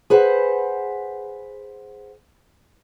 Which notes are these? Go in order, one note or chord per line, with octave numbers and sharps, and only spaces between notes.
G#4 B4 C5 F#5